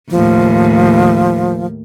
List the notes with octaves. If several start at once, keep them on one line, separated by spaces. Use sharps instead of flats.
D#2 A2 F3